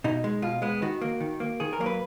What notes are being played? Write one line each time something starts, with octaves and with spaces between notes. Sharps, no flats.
B2 D#4
G#3
B2 F4
G#3 B3
D#3 F#4
A#3
D#3
A#3
D#3 G#4
A#4
F#3 A#3
B4